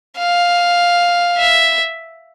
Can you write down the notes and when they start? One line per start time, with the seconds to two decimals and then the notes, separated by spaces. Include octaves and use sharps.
0.19 F5
1.38 E5